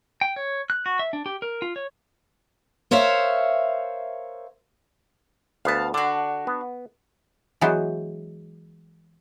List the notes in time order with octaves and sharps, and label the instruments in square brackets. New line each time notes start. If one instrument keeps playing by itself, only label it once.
[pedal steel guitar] G5
C#5
F#6
F#4
E5
D4
G4
A#4
F4
C#5
[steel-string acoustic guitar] A#4 C5 C#5 E5 F5
[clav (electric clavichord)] D2 B3 [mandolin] F5 A5
[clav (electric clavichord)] D3 [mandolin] D4 F#4
[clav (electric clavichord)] B3
[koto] E3 F#3 G#3 B3 F#4 C5